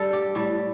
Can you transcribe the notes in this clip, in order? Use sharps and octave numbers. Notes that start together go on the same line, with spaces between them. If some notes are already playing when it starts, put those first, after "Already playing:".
Already playing: G2 G3 A4
G4
A2 G3